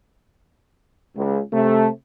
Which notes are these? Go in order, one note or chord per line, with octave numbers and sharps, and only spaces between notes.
C#2
C3 A3